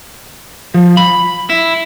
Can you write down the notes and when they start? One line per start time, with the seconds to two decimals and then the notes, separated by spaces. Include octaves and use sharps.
0.74 F3
0.97 B5
1.50 E4